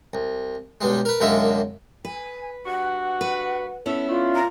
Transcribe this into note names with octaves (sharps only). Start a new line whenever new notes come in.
C2
B1 G2 G3 G#3
A#4 B4
C2 F#2 D3 G#3 A#3 E5
B4 G#5
G2 F#4 F#5
B4
B3 C#4 E4 A4 E5
A2 A3 D4 F4
A#2 A#5